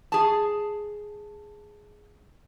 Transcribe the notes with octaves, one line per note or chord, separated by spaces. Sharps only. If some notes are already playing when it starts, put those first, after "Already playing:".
G#4 A5